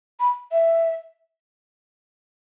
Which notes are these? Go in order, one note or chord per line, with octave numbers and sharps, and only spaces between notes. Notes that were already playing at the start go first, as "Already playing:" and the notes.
B5
E5